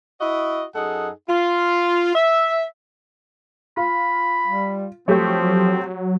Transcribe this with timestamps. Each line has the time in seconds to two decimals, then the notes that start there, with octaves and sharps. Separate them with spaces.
0.21 E4 F#4 D#5
0.75 F#2 D#4 G#4 A4 F#5
1.29 F4
2.15 E5
3.77 F4 B5
4.47 G3
5.08 F3 F#3 A3 C4 G4 C#5